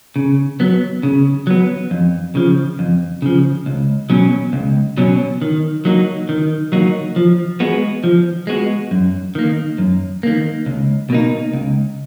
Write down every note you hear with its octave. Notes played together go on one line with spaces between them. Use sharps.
C#3
F#3 B3
C#3
F#3 B3
F2
C#3 F3
F2
C#3 F3
C#2
B2 F#3 C#4
C#2
B2 F#3 C#4
D#3
F#3 A#3 D#4 F#4
D#3
F#3 A#3 D#4 F#4
F3
G#3 B3 F#4
F3
G#3 B3 F#4
F#2
D#3 A#3
F#2
D#3 A#3
C#2
B2 A#3 D#4
C#2